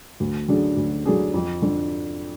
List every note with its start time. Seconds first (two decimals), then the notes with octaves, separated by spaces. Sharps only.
0.20 D2
0.48 D3 F#3 D4 G#4
0.77 D2
1.05 D3 F#3 D4 G#4
1.34 F2
1.62 D3